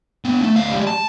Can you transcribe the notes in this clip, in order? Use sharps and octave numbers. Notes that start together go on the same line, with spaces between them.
B3 D4
A3
D2 F5
G3 G#3
A5